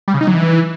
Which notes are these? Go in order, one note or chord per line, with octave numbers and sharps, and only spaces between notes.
G3
C#3
D#4
F#3
E3